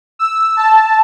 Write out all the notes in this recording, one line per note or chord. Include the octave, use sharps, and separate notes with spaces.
E6
A5